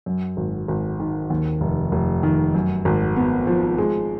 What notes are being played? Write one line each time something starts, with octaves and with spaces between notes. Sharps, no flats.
F#2
G#1
G#1
D#3
D#2
F1
F1
D#3
F#2
G#1
B3
F3
G#3